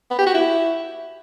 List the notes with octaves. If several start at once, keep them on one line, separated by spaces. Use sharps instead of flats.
B3
G4
F#4
E4